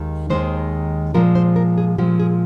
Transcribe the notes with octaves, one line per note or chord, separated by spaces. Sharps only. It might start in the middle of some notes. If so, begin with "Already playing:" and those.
Already playing: D#2 D#3 G#3
D#2 D#3 G#3 C5
A#2 F3 G#3 A#4
C5
A#4
G#4
A#2 F3 G#3 G4
G#4